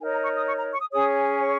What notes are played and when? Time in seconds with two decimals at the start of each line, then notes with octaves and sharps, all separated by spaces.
0.01 D#4 A#4 C#5 G#5
0.13 A#5
0.23 C#6
0.36 D#6
0.46 C#6
0.57 A#5
0.73 C#6
0.80 D#6
0.92 C#4 G#4 C#5 D#6
1.38 C#6